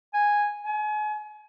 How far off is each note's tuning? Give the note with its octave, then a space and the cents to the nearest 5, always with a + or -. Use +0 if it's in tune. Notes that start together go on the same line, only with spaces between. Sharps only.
G#5 -5
G#5 +35